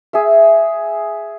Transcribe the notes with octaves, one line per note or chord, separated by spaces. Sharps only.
G#4 E5